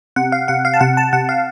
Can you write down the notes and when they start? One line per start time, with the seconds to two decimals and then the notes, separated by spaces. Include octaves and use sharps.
0.16 C3 F#5
0.32 F5
0.48 C3 F#5
0.65 F5
0.74 A5
0.81 C3 F#5
0.97 A5
1.13 C3 F#5
1.29 F5